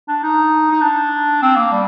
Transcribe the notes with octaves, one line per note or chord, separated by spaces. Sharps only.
D4
D#4
D#4
D4
C4
A#3
G3